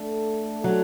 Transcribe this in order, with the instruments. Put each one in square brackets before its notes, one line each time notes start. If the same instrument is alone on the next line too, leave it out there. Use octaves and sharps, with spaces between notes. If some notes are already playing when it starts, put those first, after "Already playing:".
Already playing: [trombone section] A3 D4 A4
[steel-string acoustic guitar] F#3